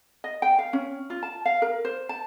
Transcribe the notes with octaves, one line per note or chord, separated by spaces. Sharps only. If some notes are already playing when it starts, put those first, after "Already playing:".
D#5
G5
F5
C#4
F4
A5
F5
A#4
C5
A5